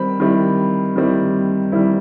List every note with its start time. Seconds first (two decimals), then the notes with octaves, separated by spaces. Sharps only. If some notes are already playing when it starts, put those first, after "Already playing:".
Already playing: D#3 G3 C4 B5
0.20 D#3 G3 C4 E4
0.96 D#3 G3 C4 E4
1.72 D#3 G3 C4 E4